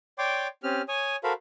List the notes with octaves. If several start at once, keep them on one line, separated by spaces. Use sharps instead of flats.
C#5 D5 G5 C6 D6
C4 C#4 G4 F6
C#5 G#5 D#6
F#4 A4 A#4 C5 F5 B5